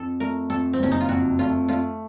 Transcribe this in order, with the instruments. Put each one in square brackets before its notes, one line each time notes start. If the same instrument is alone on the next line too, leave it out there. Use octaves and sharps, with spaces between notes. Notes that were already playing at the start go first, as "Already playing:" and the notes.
Already playing: [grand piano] F2 [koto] A4
[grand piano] A3 [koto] A#4
[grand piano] F2 [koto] A4
[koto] C4
[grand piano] F#1 [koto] C#4
[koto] D#4
F4
[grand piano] F2 [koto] F#4
[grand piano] A3 [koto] F4
[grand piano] A3 [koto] F4